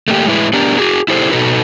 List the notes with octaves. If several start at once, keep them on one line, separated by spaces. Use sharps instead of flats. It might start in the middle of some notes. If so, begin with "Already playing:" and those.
A3 A#3 G4
A2 G#3 E4 B4
B3 D4 G4 A#4
F#4 G#4
E4 G4 A4 C5
B2 D#4 F#4 A4 B4